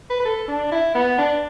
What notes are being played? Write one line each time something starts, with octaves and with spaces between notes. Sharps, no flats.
B4
B4
A4
D4
E4
B3
D4